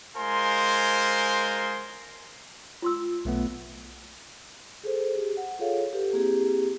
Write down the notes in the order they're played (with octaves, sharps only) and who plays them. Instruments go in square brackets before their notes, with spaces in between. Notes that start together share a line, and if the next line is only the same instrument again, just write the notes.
[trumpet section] G#3 F4 A#4 C5 G#5 C6
[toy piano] F4 C6 E6
[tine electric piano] B1 A3 B3
[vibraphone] G#4 A4 C5
G4 G#4
F#5
F4 G#4 A4 C#5 F5
G4 A4 B4
A#3 C4 E4 G4 G#4